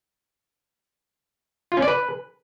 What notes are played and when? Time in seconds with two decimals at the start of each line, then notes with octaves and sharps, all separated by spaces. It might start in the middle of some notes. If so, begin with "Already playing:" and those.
1.72 F4
1.77 C#4
1.82 D5
1.88 B4